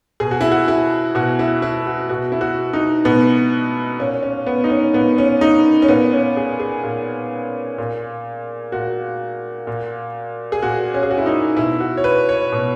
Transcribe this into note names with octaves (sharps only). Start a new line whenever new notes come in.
B2 G#4
F#4
E4
F#4
E4
B2 F#4
E4
E4
F#4
B2 F#4
E4
F#4
D#4
B2 B3
A#2 C#4
C#4
B3
D#4
C#4
A#2 B3
C#4
D#4
C#4
A#2 B3
C#4
G#4
G#4
A#2
A#2
A#2 F#4
A#2
G#4
A#2 F#4
C#4
G#4
F#4
E4
D#4
B2 E4
F#4
C#5
B4
C#5
B2